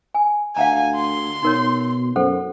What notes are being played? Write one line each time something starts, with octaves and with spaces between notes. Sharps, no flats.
G#5
D2 F5 F#5 G#5 A#5
C6
B2 D#4 A#4 C#5
F#2 A4 C5 F#5